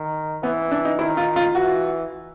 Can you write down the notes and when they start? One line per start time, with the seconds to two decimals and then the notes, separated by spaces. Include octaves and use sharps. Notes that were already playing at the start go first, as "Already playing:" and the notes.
Already playing: D#3
0.43 E3 B3
0.71 D4
0.85 D#4
0.98 D#3 E4
1.17 F4
1.36 F4
1.54 E3 F#4